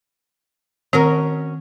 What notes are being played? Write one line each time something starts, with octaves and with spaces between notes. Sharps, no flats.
D#3 C4 C#4 F#4 A#4